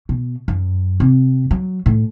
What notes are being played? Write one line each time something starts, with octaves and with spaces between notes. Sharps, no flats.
B2
F#2
C3
F#3
A2